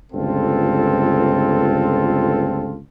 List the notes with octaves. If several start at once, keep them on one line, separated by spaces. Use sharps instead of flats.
G1 C#2 C4 F4 A4